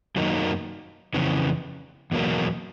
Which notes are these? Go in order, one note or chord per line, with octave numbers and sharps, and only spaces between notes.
F#2 D#3 F#3 A#3 D#4
F2 C#3 E3
E2 B2 F#3 A#3